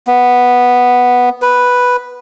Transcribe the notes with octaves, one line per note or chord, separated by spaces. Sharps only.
B3
B4